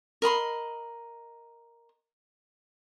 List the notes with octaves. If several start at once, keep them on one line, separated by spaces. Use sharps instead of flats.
A#4 D#5 B5 C6